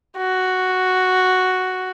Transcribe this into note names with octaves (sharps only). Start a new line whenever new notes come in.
F#4